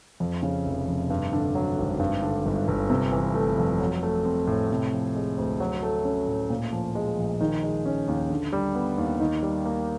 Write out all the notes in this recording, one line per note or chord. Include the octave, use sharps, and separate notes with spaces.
F2
C#3
F1
F1
G2
D3
F#3
G#1
G2
D3
G1
G1
C3
E3
A3
F2
F#3
A3
C4
A2
C3
F3
G#3
D2
F#3
A3
C#4
A2
A#2
F3
G#3
A#1
D#3
G#3
C#4
D#2
D3
G3
B3
D#2
D#3
G3
A#3